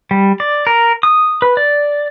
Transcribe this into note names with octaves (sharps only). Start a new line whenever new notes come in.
G3
D5
A#4
D#6
B4
D5